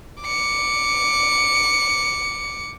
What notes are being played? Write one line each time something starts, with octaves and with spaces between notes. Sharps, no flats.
D6 C#7